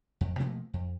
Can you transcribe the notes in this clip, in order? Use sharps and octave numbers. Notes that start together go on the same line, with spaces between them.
F2
B2 F3 A3 A#3
F2